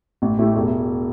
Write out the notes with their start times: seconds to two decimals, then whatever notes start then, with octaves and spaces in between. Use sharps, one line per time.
0.22 A1
0.38 A2 A3 E4 G4
0.55 E1